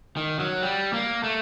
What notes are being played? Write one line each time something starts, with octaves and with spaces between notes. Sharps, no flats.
D#3
F#3
G3
A#3
A3